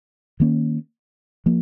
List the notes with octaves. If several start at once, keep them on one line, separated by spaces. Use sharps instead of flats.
D#3 A#3 C#4
F3 A#3